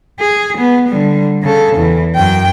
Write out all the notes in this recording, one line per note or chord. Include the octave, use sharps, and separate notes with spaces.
G#4
B3
D3 G3
C#3 A4
E2 E3
F#2 G5